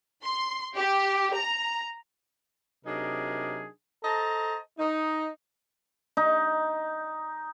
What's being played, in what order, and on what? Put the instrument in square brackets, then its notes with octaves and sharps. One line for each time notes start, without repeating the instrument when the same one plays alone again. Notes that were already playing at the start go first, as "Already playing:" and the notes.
[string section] C6
G4
A#5
[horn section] C3 F#3 D4 D#4 G#4 A#4
A4 C5 D#5 A5 A#5
D#4
[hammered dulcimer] D#4